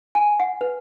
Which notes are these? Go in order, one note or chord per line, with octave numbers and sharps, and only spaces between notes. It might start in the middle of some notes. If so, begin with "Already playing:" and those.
G#5
F#5
B4